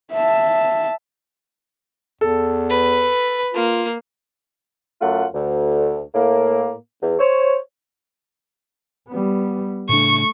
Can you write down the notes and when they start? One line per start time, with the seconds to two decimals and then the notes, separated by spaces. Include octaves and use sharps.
0.13 E5 A5
2.21 E2 A4
2.70 B4
3.54 A#3 F4
5.01 F#2 A3 F4 F#5
5.33 D2
6.14 A2 A#3
7.01 E2
7.19 C5 C#5
9.08 G3 B3
9.89 A2 C#3 A3 D4 C#6